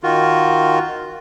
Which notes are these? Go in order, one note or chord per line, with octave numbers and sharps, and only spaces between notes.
D#3 F4 F#4